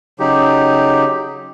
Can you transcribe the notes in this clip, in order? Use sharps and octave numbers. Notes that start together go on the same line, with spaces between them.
C#3 F#3 D#4 G4